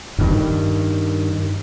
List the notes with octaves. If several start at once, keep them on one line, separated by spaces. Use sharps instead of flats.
G2 D#3